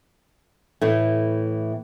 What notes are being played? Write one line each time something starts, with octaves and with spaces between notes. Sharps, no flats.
A2 E3 A3